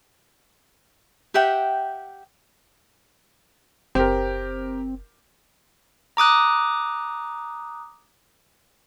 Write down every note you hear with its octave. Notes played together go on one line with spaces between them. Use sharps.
G4 E5 F#5 G5
F#1 C4 G4 A#4
A#5 D6 D#6 F#6